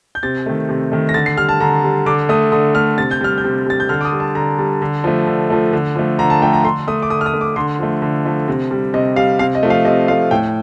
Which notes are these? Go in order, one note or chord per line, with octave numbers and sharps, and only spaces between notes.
G6
C3 A6
D#3 A3
C3
D#3 A3
A#6
D3 A6
C7
G3 F6
A5
D3 A#5
G3
D3 D6
A3 D#6
D3 D#6
A3 F6
C3 A6
G6
G3 F6
G6
C3
G3 A6
G6
D3 F6
D6
D#6
G3
A5
D3 A#5
G3
D3
F3 A3
D3
F3 A3
D3
F3 A3
D3 A#5
A5
F3 A3 G5
A#5
D3 C6
A3 D#6
D6
D3 D#6
F6
D#6
A3
D6
D3 C6
F3 A3
D3
F3 A3
C3
G3
C3 D#5
G3 F5
C3 F5
D#5
F3 A3
F5
C3 D#5
F3 A3 F5
A2 G5